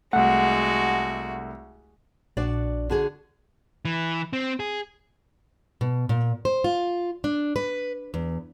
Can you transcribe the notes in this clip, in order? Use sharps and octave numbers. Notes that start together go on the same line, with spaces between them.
C2 G#3 A3 F#4 F#5
A#1 D4 F#4 D5
D3 F#4 G#4
E3
C4
G#4
B2
A#2
C5
F4
D4
B4
E2